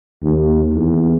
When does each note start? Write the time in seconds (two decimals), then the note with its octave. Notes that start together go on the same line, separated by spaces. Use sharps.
0.23 D#2
0.74 E2